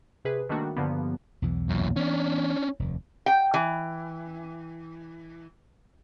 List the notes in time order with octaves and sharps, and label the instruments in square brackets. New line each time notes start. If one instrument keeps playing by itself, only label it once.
[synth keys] C3 G#4 B4
D#3 G3 A3 A#3 D4 F#4
G2 D3 F3 A#3 B3
[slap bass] B1 E2 E3
[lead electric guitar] F#2 A#2
[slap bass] E3 B3 [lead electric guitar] C#4 D4
[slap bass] F1 D#2
[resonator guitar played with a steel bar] G5
E3